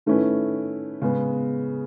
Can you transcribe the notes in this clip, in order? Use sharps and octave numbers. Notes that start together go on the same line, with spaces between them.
D#3 A3 C#4 E4 B4
C#3 G#3 B3